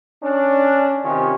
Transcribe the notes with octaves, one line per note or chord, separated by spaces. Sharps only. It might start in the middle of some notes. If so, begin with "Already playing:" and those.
C#4 D4
C3 D#3 C#4 F4 G4